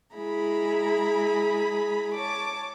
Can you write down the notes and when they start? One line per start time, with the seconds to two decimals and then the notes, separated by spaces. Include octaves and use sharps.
0.15 G#3 E4 G#4 A#5 B5
2.14 C#5 A5 D6